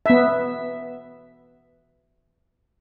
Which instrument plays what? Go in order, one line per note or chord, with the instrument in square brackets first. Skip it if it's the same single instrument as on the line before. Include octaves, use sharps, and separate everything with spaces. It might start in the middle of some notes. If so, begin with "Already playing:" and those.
[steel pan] B3 E5